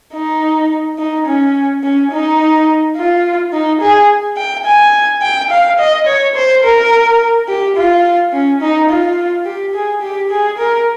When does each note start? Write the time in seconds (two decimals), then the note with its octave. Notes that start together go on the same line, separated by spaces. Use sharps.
0.14 D#4
0.99 D#4
1.26 C#4
1.83 C#4
2.12 D#4
2.97 F4
3.53 D#4
3.81 G#4
4.38 G5
4.66 G#5
5.22 G5
5.51 F5
5.79 D#5
6.07 C#5
6.35 C5
6.64 A#4
7.48 G4
7.77 F4
8.33 C#4
8.61 D#4
8.90 F4
9.46 G4
9.75 G#4
10.02 G4
10.31 G#4
10.59 A#4